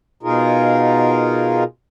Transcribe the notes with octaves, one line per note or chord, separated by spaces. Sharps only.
B2 D#4 F4 G#4 A#4